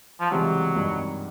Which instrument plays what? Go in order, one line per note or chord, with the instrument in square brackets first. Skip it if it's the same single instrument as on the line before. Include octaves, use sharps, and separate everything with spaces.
[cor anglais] F3
[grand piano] C#2 C3 E3 G3 C4 [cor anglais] F#3
[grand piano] G#1 G2 D#3